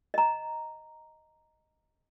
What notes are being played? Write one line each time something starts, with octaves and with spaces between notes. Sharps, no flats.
D#5 A#5